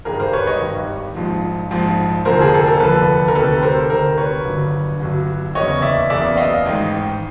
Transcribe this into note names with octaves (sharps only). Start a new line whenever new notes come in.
G#1 G2 D#3 G3 G#4 A#4
A#4 C5
B4 C#5
C#5 D#5
G#1 G2 D#3 G3
A#1 G#2 F3
A#1 G#2 F3
F1 D#2 D3 F3 A#4 C5
G#4
A4
A#4
F1 D#2 D3 F3 A4 B4
A#4
D2 C3 D#3 A4 B4
A#4 C5
D2 C3 D#3 A#4 C5
B4 C#5
G1 G2 D3 F#3
G1 G2 D3 F#3
F#1 E2 C#3 C#5 D#5
D5 E5
F#1 E2 C#3 D5 E5
D#5 F5
A1 G#2 D#3